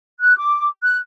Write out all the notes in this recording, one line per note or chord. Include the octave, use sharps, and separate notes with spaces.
F#6
D6
F#6